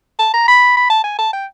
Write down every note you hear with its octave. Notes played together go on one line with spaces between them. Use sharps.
A5
A#5
B5
B5
A5
G#5
A5
G5